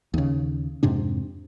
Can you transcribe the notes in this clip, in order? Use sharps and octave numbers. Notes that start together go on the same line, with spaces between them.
D#2 C#3
F2 G#2 C3 D4